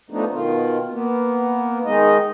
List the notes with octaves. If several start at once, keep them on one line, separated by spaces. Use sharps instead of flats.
F3 A3 B3 D4 D#4
B2 D#3 F4
A#3 B3
D#3 G#3 D#4 D#5